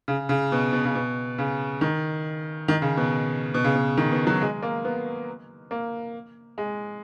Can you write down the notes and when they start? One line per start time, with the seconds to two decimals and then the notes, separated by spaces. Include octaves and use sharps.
0.08 C#3
0.29 C#3
0.52 B2
0.73 B2
0.85 C#3
0.95 B2
1.38 C#3
1.81 D#3
2.68 D#3
2.82 C#3
2.97 B2
3.54 B2
3.64 C#3
3.75 B2
3.97 D#3
4.12 B2
4.27 F#3
4.41 G#3
4.62 A#3
4.84 B3
5.71 A#3
6.58 G#3